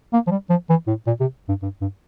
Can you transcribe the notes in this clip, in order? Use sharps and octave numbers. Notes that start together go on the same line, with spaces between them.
A#3
F3
G3
F3
E3
A2
A#2
C3
G2
G2
G2